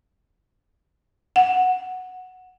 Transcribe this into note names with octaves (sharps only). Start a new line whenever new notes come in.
F#5